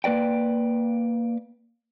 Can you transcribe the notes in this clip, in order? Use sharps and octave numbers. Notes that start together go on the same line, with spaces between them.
A#3 B4 D5 G5